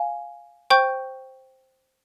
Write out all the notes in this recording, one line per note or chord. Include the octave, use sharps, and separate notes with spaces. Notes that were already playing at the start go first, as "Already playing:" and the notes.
Already playing: F5 G#5
C5 G5 C#6 G6